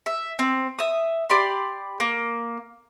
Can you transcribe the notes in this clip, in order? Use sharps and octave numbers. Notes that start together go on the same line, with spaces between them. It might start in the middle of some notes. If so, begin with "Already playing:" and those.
E5
C4
E5 D#6
G4 D5 B5 C6
A#3